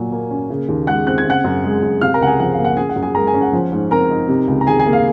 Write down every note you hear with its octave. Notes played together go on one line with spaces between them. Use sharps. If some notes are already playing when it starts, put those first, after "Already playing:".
Already playing: A#2 F#3 G#5
A#3
C#4
C#3
D#2
G#3 F#5 F#6
C4 F#6
G#6
C#3 F#5 F#6
F#2
G#3
F#2
C3 F5 F6
A#4 A#5
C#2 F#5
G#4 G#5
F3 F#5
F5
A#3
F#5
C#3 G#4 G#5
F#5
F#2
G#4 G#5
G#3 A#4 A#5
G#4 G#5
C#4
F#5
F3
G#2
C4 A#4 A#5
D#4
C3
C#2
A#5
D#3 G#4 G#5
G#4 G#5
A#3
F5